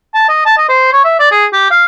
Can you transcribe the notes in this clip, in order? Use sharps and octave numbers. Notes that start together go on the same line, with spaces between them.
A5
D#5
A5
D#5
C5
C#5
E5
D5
G#4
G4
F5